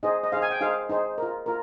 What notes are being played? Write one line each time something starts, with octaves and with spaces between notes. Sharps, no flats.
D#4 G#4 C5 D#5
D#5
D#4 G#4 C5 F5
G#5
G5
D#4 G#4 C5 F5
D#4 G#4 C5
F4 A#4
F4 A#4